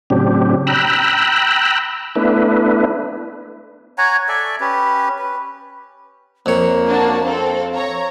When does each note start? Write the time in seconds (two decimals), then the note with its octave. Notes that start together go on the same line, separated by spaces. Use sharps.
0.10 A2 C#3 F#3 C4 D4 G4
0.67 G5 A#5 B5 E6 F#6
2.16 A3 B3 D4 E4 B4
3.98 C#5 F#5 G#5 A#5
4.29 A4 D5 E5 G#5
4.60 C#4 G4 B4
5.18 B4
6.46 F2 A#3 C#5
6.88 D4 F#4 A5
7.24 C4 A4 F5
7.75 C#5 A#5